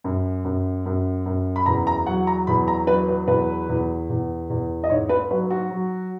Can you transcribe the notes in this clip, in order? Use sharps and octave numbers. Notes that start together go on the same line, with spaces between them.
F#2
F#2
F#2
F#2
B5
E2 A#5
A#5
F#3 F#5
A#5
E2 B5
A#5
F#3 B4
B4
E2 B4
E2
E2
E2
D#5
G#2 C#5
B4
F#3 B4
F#4
F#3